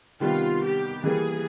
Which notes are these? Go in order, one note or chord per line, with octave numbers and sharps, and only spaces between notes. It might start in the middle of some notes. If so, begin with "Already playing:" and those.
C3 D#3 G3 B3 F4
G4
E3 G3 A#3 G#4